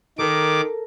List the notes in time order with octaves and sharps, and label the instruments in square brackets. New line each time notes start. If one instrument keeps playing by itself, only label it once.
[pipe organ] D#3 D6 [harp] A4 A#4